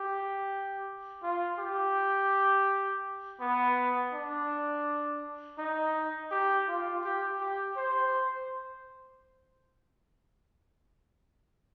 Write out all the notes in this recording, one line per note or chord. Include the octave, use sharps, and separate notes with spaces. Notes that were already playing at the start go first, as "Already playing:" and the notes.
Already playing: G4
F4
G4
B3
D4
D#4
G4
F4
G4
G4
C5